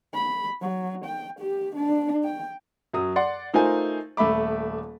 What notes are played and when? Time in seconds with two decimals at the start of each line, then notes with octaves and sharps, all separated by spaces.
0.14 B5
0.61 F#3
1.05 G5
1.40 G4
1.76 D4
2.24 G5
2.93 F#2 F#3 D#6
3.16 D5 F#5 C6
3.53 A3 D#4 F4 A#4 C5 G#5
4.17 D#1 A3 E5 B5 D6